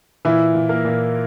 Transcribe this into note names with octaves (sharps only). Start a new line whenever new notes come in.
A#2 E3 E4
A#2
A#3 A#4
A#2